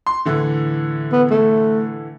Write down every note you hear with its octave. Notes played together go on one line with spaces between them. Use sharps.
C6
A2 D3 E3
B3
A3